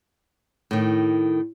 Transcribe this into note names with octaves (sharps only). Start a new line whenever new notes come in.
A2 D#3